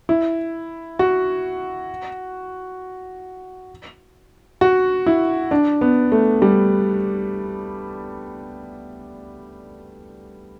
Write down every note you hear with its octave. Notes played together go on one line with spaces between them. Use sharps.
E4
F#4
F#4
E4
D4
B3
A3
G3